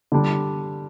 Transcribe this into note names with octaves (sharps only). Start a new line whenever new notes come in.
D3 G3 D4